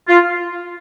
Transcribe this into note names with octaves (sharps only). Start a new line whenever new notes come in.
F4